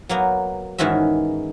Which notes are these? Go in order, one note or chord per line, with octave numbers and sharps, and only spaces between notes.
F#3 A#3 B3
G#2 D#3 E3 C#4 F#4 E5